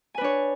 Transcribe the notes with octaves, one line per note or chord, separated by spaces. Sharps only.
D4 B4 C#5 G#5